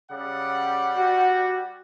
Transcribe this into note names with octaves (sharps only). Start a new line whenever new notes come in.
C#3 G3 D5 F#5
F#4